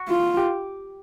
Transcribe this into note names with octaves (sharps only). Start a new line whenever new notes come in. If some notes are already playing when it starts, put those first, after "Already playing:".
Already playing: F#4
F4
G4